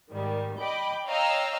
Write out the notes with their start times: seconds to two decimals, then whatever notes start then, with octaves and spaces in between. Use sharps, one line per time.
0.11 G#2 D#3 G3
0.60 D#5 G5 B5 D6
1.06 C#5 D#5 F5 G5 A#5 E6